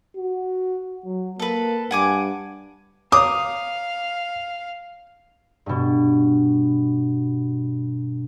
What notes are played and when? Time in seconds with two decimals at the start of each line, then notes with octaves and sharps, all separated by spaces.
0.17 F#4
1.06 F#3
1.40 A#3 A4 B4
1.91 G2 F#5 G#5 D6
3.12 C#5 F5 A#5 D6 D#6
5.66 G2 B2